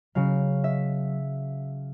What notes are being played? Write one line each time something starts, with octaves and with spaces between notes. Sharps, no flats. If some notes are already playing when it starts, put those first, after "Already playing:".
C#3 F#3 F5
E5